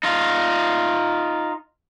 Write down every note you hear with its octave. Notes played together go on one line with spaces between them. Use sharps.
D#4 F4